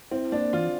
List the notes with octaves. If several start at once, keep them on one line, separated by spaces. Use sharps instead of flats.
C4 E4
A#3 D4
E3 F4